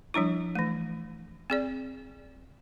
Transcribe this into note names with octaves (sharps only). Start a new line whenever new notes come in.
F3 G3 D4 E4
E3 A3
C4 G#4 D5